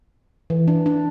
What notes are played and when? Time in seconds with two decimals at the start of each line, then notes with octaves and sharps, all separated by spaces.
0.50 E3
0.68 D4
0.86 D4